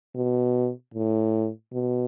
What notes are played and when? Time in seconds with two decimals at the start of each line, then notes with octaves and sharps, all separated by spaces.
0.15 B2
0.94 A2
1.73 B2